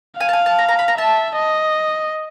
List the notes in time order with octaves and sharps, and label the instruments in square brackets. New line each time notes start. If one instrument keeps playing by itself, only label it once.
[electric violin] F5 [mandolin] G#5
[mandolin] A5
G#5
A5
A#5
A#5
B5
A#5
[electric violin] E5 [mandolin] A5
[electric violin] D#5